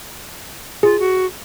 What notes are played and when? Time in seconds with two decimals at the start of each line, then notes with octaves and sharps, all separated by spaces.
0.83 F4 G#4
0.99 F#4